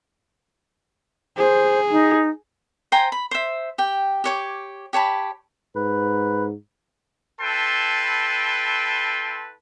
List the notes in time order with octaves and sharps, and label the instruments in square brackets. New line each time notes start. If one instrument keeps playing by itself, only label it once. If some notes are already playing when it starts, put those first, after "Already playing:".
[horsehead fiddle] G#4 [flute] C5
[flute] D#4
[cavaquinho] C5 G5 G#5 A#5
B5
C5 E5
G4 G5
G4 C#5 D6
G4 C#5 A5 B5
[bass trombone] G#2 [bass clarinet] B4
[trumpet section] E4 A4 B4 G5 A5 C6